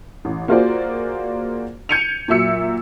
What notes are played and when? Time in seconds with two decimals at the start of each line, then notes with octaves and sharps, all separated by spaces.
0.25 A1
0.48 A#3 F4 F#4 G#4 C5 D5
1.89 G6 G#6 C#7 D#7 F7
2.28 A#2 F#3 E5 E6 C#7